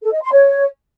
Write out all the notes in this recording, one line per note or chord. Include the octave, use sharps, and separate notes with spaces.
A4
D#5
C6
C#5